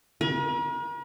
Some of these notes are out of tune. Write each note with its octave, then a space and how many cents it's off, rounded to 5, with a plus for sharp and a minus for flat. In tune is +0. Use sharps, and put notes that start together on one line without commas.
A#4 +45